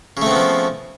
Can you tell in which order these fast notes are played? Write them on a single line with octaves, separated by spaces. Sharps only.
C#3 A3 C4 B3 F3